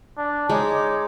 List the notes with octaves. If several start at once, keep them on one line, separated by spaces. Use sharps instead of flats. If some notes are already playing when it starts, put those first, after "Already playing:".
D4
G#3 D#4 C#5 D6